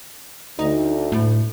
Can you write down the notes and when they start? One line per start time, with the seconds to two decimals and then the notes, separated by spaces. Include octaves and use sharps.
0.59 D2 D#4
1.12 A2